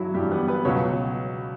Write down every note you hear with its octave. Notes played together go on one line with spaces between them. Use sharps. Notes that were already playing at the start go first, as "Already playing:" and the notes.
Already playing: G2 E3 F#3 E4 F#4
G2 E3 G3 G4
B3 B4
B3 B4
C#2 B2 F#3 C#4 C#5